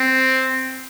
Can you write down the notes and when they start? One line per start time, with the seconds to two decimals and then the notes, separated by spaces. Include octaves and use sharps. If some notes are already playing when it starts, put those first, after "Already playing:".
Already playing: C4